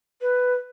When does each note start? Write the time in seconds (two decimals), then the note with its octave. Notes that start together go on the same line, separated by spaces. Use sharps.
0.22 B4